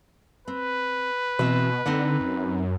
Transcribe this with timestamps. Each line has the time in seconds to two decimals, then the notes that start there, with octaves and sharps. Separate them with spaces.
0.48 C4 B4
1.39 B2 E3 C4
1.86 D3 C4 D#4 F#5
2.20 F#2